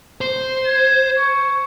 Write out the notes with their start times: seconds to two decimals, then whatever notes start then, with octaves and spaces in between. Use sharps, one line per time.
0.21 C5
0.67 G#6
1.19 C#6